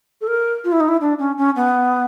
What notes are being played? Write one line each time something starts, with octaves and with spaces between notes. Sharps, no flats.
A4
A#4
F4
E4
D#4
E4
D4
C#4
C#4
B3